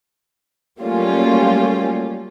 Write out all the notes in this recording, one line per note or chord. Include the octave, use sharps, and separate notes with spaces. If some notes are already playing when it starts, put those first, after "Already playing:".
F#3 G3 A3 A#3 C#4 F4